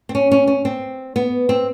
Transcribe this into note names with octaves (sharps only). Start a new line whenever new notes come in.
C4
C#4
C#4
C#4
C4
B3
C4